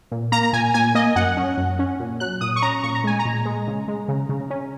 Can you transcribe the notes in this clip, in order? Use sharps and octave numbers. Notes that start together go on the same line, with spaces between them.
A#2
A#3 A#5
A#5
A#2 G#5
A#2 G#5
A#3 D#5
F#2 F#5
C#4
F#2
C#4
A#2
F#3 F#6
A#2 D#6
C#6
C#4 A#5
A#2 C#6
A#5
G#3 G#5
A#5
A#2
G#3
C#3
G#3
C#3
C#3
C#4